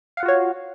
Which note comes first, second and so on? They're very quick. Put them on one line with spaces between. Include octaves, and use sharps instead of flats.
F5 F#5 F4 F#4 C#5